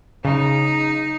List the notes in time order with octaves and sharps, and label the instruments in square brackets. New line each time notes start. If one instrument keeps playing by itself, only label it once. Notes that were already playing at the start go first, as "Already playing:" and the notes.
[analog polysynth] C#3 [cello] D#4